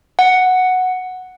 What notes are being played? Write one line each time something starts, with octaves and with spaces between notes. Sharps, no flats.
F#5